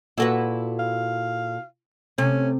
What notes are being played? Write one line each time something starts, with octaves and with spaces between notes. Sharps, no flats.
A#2 E4 F#4 A4 B4
F5
C3 A3 C#4